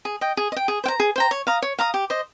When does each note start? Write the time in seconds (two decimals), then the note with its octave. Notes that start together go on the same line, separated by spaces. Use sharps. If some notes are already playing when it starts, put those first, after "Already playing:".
0.05 G#4
0.21 D#5 G5
0.37 G#4
0.52 D#5
0.56 G5
0.68 G#4
0.84 C5 G5
0.88 A#5
1.00 G#4
1.16 C5 G5 A#5
1.31 C#5
1.47 F5 A#5 D#6
1.62 C#5
1.79 F5 A#5 D#6
1.94 G4
2.10 C5 D#5